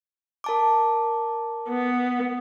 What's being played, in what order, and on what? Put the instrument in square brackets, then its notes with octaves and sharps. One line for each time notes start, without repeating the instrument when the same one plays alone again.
[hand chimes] A#4 A5 D6
[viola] B3